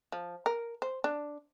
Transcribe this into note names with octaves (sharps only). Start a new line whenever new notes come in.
F3
A#4
C5
D4